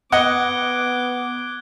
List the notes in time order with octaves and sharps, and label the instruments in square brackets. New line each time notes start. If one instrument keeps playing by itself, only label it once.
[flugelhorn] B3 [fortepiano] D#5 F#5 [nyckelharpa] D6 [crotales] F#6 G#6 G7